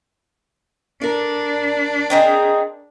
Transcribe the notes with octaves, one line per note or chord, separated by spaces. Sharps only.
D4 A#4 D5
C4 D#4 G#4